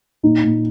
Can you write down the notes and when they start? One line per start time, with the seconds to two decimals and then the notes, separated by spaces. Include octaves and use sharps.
0.23 A#2 D#4
0.44 A#2